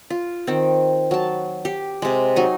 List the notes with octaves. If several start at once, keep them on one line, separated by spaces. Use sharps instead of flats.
F4
D#3 C4
F#3 A5
G4
C3 G#3
F#3 D#4 G#5